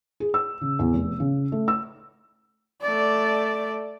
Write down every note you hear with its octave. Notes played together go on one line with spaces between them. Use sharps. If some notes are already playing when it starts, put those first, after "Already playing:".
G#4
E6
C#3
E2
F1
C#3
A3
E6
A3 D5